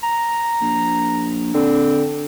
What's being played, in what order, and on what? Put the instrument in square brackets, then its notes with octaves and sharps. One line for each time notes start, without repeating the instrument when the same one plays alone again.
[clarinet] A#5
[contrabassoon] A#1
[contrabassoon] D3 [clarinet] C4